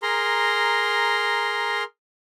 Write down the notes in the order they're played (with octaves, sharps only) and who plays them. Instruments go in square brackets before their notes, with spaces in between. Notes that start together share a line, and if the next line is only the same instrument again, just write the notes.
[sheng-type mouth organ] G#4 A#4 A#5 C6